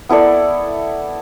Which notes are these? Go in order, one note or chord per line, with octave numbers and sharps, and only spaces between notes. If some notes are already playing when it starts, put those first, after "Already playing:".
B3 E4 A4 D5